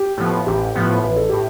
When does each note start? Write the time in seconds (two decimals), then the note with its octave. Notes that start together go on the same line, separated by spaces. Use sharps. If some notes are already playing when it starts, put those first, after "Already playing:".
Already playing: G4
0.17 A2 F3 B3
0.47 A1 G4
0.75 A2 F3 B3
1.03 A1 B4
1.16 A4
1.29 A2 G4